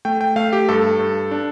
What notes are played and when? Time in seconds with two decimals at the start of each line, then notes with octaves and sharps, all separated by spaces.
0.05 A3 G5
0.21 G5
0.36 A3 F5
0.53 G4
0.69 G2 A4
0.99 G2
1.31 D4